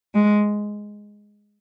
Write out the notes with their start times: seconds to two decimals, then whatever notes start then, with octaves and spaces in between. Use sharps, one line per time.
0.14 G#3